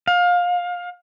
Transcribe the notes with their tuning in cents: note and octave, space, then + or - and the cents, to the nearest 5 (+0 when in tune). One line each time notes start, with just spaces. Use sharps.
F5 +25